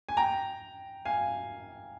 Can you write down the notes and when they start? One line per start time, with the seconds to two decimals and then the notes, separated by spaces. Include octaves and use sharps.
0.09 G#5
0.17 G5 A#5
1.05 F5 G#5